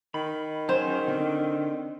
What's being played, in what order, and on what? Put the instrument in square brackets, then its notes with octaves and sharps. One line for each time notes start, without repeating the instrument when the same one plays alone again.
[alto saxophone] D#3 [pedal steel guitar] B5
[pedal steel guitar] F#3 C#4 G#4 [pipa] C5
[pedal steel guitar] D3 C4 D4